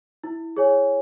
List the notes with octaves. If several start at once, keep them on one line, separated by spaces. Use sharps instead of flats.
E4
G#4 C#5 G#5